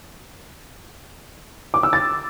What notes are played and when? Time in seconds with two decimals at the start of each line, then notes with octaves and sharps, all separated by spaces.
1.74 D6
1.83 E6
1.93 A6